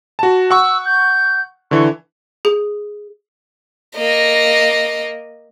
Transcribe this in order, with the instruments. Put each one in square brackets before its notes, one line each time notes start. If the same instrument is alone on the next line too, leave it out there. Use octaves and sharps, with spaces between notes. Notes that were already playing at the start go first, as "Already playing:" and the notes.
[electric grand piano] F#4 A5
[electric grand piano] F#5 C#6 [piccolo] E6
[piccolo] G6
[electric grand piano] D3 E3 [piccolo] C#6
[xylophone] G#4
[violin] A#3 D#5